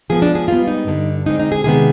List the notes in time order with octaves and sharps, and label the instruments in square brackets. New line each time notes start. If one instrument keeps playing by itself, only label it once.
[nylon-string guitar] G#2 F3 B3 G#4
D4
G#4
G#2 G3 B3 F4
D#4
G2 D3 G3
D3 G#3 C4 D#4
D#4
G#4
C3 D#3 G#3 B3 G#4